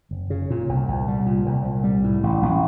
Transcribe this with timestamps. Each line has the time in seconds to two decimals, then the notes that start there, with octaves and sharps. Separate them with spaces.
0.11 F#1
0.30 C#3
0.50 A#2
0.69 C2
0.88 C2
1.08 G3
1.26 A#2
1.46 C2
1.65 C2
1.84 G3
2.04 A2
2.23 A1
2.42 A1